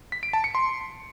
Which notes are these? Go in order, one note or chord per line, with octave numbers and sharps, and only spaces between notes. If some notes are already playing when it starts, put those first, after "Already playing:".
B6
D7
A5
C#7
C6